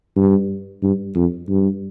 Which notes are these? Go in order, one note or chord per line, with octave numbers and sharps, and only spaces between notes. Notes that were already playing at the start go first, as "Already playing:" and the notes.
G2
G2
F2
G2